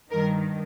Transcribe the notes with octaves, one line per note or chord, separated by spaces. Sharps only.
G2 D#3 A#4